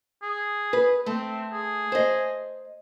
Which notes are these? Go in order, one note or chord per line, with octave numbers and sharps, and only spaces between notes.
G#4
B4
A3 C4
G#4
C5 D#5